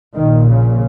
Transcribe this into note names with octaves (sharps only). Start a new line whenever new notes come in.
A#1 A#2 D#3
C#3